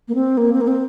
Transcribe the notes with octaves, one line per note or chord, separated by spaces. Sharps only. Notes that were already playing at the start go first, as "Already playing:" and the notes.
A#3
C4
A#3
C4
A#3
C4